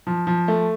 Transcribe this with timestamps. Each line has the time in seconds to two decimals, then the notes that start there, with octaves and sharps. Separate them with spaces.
0.07 F3
0.27 F3
0.48 A3